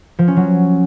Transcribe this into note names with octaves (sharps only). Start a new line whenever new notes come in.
F3
C#4
F#3